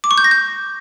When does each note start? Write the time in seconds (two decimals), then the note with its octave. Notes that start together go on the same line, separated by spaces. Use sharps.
0.04 D6
0.11 C#6
0.18 G6
0.24 A#6
0.31 G6